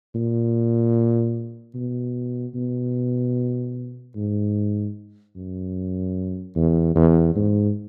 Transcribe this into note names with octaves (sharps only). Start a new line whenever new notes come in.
A#2
B2
B2
G#2
F#2
E2
E2
G#2